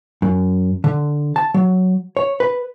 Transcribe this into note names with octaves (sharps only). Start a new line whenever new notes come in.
F#2
D3
A5
F#3
C#5
B4